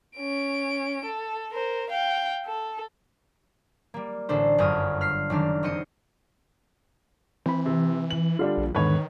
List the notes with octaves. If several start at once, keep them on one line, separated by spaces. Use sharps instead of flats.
C#4 D7
A4
A#4 C5
F5 G5
A4
G3 A#3
A1 D3 D4 A4 C5
G1 F#2 D3 D#6 F6
F6 B6 C7
F#1 D#3 D4 F6
F1 C4 D#5 C6 C#7 D#7
E3 C4 B5
C3
F#7
D3 G3 D4 F4
A#1
E2 G#2 D3 D#3 B4 C#5